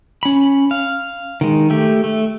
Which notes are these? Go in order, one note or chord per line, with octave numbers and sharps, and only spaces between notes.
C#4 B5
F5
D#3 G#3
A3 G4
A3